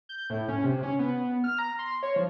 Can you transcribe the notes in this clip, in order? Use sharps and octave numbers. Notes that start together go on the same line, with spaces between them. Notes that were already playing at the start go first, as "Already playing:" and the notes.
G6
A2
C#4
C3
C#4
B3
F6
A#5
C6
C#5
F3